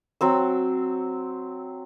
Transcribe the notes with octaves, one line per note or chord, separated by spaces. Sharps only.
F#3 C4 E6